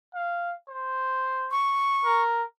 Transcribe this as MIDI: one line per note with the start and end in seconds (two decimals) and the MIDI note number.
0.14 0.52 77
0.68 1.53 72
1.51 2.22 85
2.05 2.43 70